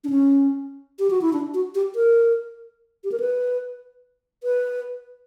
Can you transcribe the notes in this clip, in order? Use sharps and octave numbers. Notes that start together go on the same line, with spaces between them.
D4
C#4
G4
F#4
E4
D4
F#4
G4
A#4
G4
A#4
B4
B4